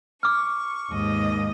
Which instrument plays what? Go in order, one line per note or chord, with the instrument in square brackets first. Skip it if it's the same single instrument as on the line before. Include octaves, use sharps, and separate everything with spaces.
[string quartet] C#6 [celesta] D6 F6
[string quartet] D#2 G#2 D#5